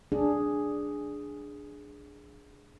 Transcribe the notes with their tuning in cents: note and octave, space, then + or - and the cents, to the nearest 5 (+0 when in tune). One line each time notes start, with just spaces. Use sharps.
D4 +0 G#4 +0